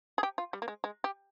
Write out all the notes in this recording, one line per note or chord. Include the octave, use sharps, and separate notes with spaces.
G#4
G4
F4
G3
A#3
G#3
G#3
G4